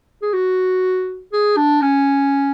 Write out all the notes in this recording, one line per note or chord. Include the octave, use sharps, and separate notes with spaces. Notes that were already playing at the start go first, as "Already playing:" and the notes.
G#4
F#4
G#4
D4
C#4